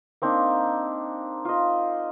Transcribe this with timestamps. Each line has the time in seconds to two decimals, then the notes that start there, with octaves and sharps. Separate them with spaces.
0.22 A#3 C4 D4 D#4
1.45 F4 D#5